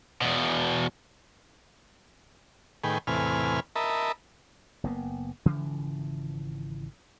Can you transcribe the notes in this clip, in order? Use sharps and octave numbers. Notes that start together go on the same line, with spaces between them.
E2 B2
A2 D#3 G#4 B4 G5
E2 A2 C3 B4 G#5 F6
A#4 D#5 E5 A5 B5
F#1 A#3 B3
G#1 C#3 E3 F3